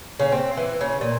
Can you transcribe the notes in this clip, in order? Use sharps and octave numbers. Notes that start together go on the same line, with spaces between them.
C#3
C4
E3
C#3
A#2